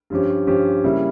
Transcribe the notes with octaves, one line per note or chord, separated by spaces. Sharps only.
G2 F3 C#4 G4
G2 F3 C#4 G4
C#3 G3 A#3 E4